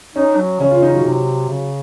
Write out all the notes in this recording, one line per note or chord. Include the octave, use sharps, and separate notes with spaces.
C#4 D#4
F#3
C#3 C#4
F4
D#4
F#3
C3
C#3